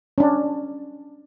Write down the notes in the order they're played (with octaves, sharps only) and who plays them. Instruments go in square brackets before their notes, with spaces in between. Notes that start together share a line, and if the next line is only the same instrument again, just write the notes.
[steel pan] C#4 D4